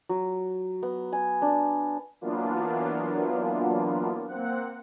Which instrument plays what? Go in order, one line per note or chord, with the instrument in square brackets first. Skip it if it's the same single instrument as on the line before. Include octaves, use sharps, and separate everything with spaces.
[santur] F#3
B3
G#5
D4
[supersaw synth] E3 F#3 A#3 B3 D4 F4
A#3 C4 F#5